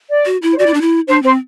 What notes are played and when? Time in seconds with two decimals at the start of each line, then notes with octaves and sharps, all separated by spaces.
0.09 D5
0.25 F#4
0.42 E4
0.53 C5
0.58 F#4 D5
0.66 E4
0.74 D4
0.81 E4
1.08 D4 C5
1.23 C4 C5